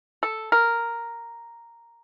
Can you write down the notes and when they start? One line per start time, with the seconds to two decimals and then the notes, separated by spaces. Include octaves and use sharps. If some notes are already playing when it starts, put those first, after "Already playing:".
0.23 A4
0.52 A#4